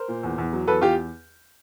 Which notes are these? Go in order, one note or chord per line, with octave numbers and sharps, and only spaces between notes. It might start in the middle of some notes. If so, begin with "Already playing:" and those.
Already playing: A#4 C5
A#2
E2
E2
F#3
E2 A4 B4
E2 F4 G4